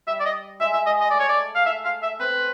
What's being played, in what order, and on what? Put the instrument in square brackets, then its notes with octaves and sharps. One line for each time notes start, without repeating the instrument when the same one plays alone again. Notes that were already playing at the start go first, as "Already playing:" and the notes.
[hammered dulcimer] G3 [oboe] E5
[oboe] D5
D#5
[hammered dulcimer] G#3 [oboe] E5
[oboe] E5
[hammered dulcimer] G#3 [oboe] D#5
[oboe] D#5
[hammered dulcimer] A3 [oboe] D5
[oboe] C#5
D5
F5
E5
F5
E5
[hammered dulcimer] C4 [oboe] B4